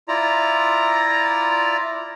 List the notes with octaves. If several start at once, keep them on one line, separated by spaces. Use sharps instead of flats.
E4 F4 D5 A#5